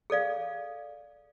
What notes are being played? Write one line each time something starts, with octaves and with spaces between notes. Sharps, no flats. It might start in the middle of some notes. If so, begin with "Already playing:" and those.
G#4 A4 D5 F5